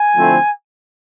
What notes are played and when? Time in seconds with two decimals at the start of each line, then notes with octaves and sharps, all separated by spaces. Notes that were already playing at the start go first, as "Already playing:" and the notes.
Already playing: G#5
0.17 D3 F3 A3 C4 E4